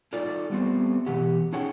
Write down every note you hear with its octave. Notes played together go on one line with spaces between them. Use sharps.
D#4 F4 A4 D5
G3 A3 B3 C4
B2 E3 G4 F#5
C#4 D#4 G#4 C#5 F#5 G5